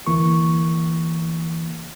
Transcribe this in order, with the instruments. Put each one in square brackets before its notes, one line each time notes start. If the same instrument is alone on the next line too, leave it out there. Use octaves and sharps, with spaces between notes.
[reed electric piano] D2 E3 A#3 C#6